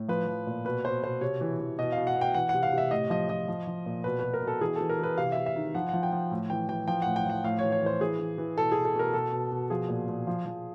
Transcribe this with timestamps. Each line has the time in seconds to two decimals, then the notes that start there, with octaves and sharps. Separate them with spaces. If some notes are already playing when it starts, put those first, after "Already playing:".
Already playing: A2
0.08 F3 B4
0.28 F3
0.47 A#2
0.65 B2 B4
0.85 B2 C5
1.03 B2 C5
1.21 C3 C#5
1.41 E3
1.60 E3
1.79 B2 D#5
1.92 F5
1.97 B2
2.07 F#5
2.17 B2 G5
2.34 E3 F#5
2.49 F#5
2.54 C3
2.63 F5
2.73 C3
2.78 E5
2.91 A2 D#5
3.10 F3 D#5
3.29 F3 D#5
3.48 F3
3.67 F3
3.86 A#2
4.04 B2 B4
4.19 B2 B4
4.34 A#4
4.43 B2 A4
4.61 E3 G#4
4.76 E3 A4
4.90 A#4
4.99 E3 B4
5.18 C3 F5
5.32 C3 E5
5.46 E5
5.56 D#3
5.75 F3 F#5
5.89 F3 F#5
6.03 G5
6.12 F3
6.31 A2
6.50 E3 G5
6.69 E3 G5
6.88 F3 G5
7.02 A2 F#5
7.16 G5
7.26 F3 F#5
7.44 A2 F5
7.59 C#5
7.64 E3
7.72 C#5
7.81 E3
7.86 C5
8.00 E3 G#4
8.19 E3
8.38 E3
8.58 B2 A4
8.72 B2 G#4
8.85 A4
8.95 B2 A#4
9.13 B2 A4
9.32 B2
9.52 B2
9.70 F3 G#4
9.89 A#2
10.09 A#2
10.27 F3
10.46 F3